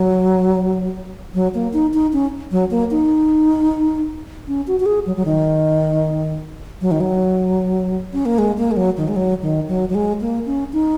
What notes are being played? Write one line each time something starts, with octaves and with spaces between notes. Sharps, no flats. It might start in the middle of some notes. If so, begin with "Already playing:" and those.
Already playing: F#3
F#3
A#3
D#4
D#4
C#4
F#3
A#3
D#4
C#4
F#4
F#4
G#4
F#3
F#3
D#3
F#3
D#3
F#3
C#4
A#3
G#3
A#3
G#3
F#3
D#3
G#3
F#3
D#3
F#3
F#3
G#3
A#3
C#4
D#4